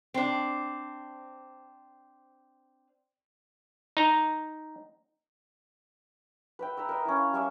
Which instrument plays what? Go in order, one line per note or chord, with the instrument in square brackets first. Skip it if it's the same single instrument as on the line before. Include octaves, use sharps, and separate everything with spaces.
[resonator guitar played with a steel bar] C4 D4
[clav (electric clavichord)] D#4 A#5
[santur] B4 E5 G5
B4 A#5 E6
A#4 D#5
C#4 E4
F5
G3 C#4 E5 D6